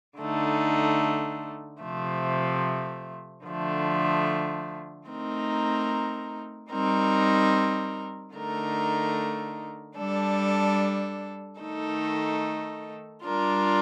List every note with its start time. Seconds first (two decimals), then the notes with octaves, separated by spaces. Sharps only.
0.19 D3 A3 D#4
1.82 C3 F3 A3
3.45 D3 F3 A3
5.08 A3 C4 D#4 A#4
6.71 G3 C4 D#4 A#4
8.34 D3 A3 D#4 A#4
9.98 G3 D4 A4
11.61 D#3 A3 D#4 A4
13.24 G3 D4 F4 A#4